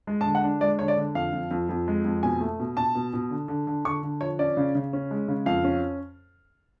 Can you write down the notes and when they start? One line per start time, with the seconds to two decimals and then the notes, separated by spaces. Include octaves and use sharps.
0.07 G#3
0.21 A5
0.25 D3
0.35 F#5
0.43 D4
0.61 G#3 D5
0.79 D3 C#5
0.88 D5
0.98 D3
1.15 F2 F5
1.33 F2
1.51 F2
1.69 F2
1.88 G#3
2.05 F2
2.23 B2 G#5
2.41 A3
2.60 B2
2.77 B2 A5
2.95 B2
3.13 B2
3.30 D3
3.48 D3
3.67 D3
3.85 D3 C#6
4.03 D3
4.21 F3 C#5
4.39 C#4 D5
4.57 C#3
4.75 C#3
4.93 C#4
5.11 G#3
5.28 C#3
5.46 F2 F5
5.64 C#4